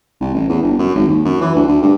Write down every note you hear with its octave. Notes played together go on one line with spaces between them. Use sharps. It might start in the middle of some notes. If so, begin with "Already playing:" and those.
C2
A1
E2
G1
F#2
G#1
D#2
F#2
E3
D2
D2
G2